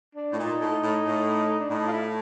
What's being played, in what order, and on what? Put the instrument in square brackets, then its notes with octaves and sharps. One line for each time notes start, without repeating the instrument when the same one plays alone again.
[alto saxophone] D4
[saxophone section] A2
[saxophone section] A#2 [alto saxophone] D#4
[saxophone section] A2
A2
A2
[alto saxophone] D4
[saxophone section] A2 [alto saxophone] D#4
[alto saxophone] F4
E4